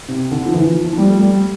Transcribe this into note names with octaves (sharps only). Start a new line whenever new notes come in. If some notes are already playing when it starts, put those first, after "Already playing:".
C3
D3
F3
E3
F3
F3
G3
A3
G3